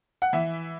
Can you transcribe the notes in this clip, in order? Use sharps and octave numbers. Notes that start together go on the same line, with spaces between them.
F#5
E3 E5